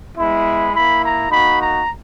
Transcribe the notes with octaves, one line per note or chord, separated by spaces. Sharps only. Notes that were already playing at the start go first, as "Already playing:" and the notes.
G#3 B3 E4 B5
A#3 E4 B5
A#5
A#3 D#4 F#4 B5
A#5